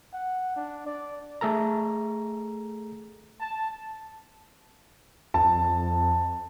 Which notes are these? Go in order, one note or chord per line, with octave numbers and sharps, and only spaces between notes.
F#5
D4
D5
A3 G#4 A4 A#5
A5
F2 A5